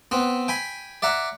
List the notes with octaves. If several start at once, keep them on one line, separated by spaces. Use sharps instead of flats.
B3 C4
G5 G#5 B5
D5 E5 F#5 A#5